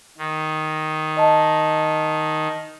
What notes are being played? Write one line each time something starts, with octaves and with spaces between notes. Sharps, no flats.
D#3
D#5 A5